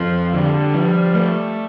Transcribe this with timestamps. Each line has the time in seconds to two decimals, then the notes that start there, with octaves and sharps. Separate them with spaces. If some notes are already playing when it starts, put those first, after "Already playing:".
Already playing: F2 F3
0.33 D3 G3
0.74 F3
1.14 A3